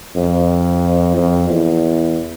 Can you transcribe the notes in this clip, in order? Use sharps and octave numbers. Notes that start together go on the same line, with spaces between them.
F2
F2
E2